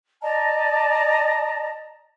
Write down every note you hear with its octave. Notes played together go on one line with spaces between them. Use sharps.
D5 D#5 A5 A#5